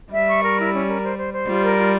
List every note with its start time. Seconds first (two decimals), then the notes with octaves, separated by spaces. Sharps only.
0.12 G3 E5
0.27 C#6
0.43 A#4
0.58 E4
0.73 C#4
0.87 A#4
1.02 C5
1.18 C5
1.32 C5
1.47 G3 F4
1.63 A#4
1.78 F4